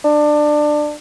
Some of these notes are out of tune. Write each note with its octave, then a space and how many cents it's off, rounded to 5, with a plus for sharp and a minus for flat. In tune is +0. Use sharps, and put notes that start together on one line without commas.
D4 +20